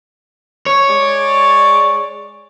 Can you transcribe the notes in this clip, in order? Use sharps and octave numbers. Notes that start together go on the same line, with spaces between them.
C#5
G#3 D5